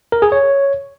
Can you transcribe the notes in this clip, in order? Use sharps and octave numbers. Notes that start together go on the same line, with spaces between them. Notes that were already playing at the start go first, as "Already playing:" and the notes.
A#4
G#4
C#5